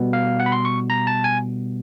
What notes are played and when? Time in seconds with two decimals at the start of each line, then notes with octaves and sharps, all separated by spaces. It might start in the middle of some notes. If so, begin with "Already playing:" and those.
Already playing: B2 G3 B3
0.13 F5
0.40 F#5
0.46 B5
0.52 C6
0.65 C#6
0.90 A#5
1.07 A5
1.24 G#5